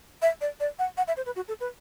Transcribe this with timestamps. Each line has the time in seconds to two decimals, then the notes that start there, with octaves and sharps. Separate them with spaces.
0.22 E5
0.41 D5
0.60 D5
0.79 F#5
0.97 F#5
1.08 E5
1.17 C5
1.26 B4
1.36 F#4
1.48 A4
1.61 B4